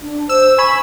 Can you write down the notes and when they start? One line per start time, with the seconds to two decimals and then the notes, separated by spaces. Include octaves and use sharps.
0.02 D4
0.29 C5 E6
0.58 G#5 B5 C#6 E6